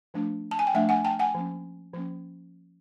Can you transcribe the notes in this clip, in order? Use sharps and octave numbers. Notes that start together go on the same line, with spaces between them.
F3 A3 D4
A5
G#5
G5
F3 A3 D4 E5 F#5
F#5 G#5
G5 A5
F#5 G#5
F3 A#3 C#4
F3 A#3 C#4